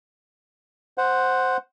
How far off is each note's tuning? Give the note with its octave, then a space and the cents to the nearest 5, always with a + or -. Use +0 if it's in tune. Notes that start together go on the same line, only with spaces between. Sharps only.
C5 +0 F#5 +0